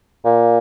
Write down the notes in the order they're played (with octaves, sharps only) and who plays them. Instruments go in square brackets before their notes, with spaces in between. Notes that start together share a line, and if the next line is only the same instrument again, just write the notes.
[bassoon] A#2